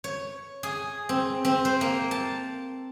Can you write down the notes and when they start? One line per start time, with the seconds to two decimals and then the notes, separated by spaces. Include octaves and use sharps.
0.04 C#5
0.63 G#4
1.09 C4
1.45 C4
1.65 C5
1.81 A#3
2.11 A5